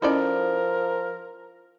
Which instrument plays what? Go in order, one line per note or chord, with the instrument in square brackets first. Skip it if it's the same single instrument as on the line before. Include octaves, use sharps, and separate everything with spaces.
[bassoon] F3 [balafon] C#4 E4 [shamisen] D#4 A4 D5 [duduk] A#4